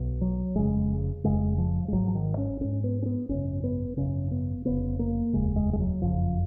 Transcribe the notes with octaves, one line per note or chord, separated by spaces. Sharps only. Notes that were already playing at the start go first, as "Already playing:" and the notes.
Already playing: B1 B2
F#3
F1 F2 C#3 G#3
F1 F2 C#3 G#3
F3
G#3
G#1 G#2 F#3
F3
D#3
C#4
G#1 G#2 C#4
B3
C#4
B3
G#1 F#2 C#3 C#4
B3
G#1 F#2 C#3 C#4
B3
F1 D#2 C#3 B3
A#3
F1 D#2 C#3 G#3
G#3
G#3
F#3
F#1 F2 C#3 F3